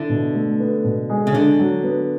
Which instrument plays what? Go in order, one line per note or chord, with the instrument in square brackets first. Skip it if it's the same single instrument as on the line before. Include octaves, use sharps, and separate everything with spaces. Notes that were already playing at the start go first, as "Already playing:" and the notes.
Already playing: [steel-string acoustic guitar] D3 [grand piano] E4
[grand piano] B2
A3
B3
B2
G#3
[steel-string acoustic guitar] C#3
[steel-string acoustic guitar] D3 [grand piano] D4
[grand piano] F#3
B3